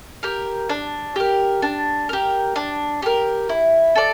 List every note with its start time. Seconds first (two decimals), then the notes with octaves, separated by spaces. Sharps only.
0.23 G4 A#4
0.69 D4
1.16 G4 A#4
1.62 D4
2.09 G4 A#4
2.56 D4
3.02 G4 A#4
3.49 E4
3.96 A4 D5